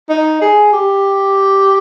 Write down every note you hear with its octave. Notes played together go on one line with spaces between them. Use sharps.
D#4
G#4
G4